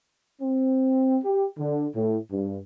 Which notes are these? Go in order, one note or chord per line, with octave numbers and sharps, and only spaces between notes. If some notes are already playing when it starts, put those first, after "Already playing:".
C4
G4
D3
A2
G2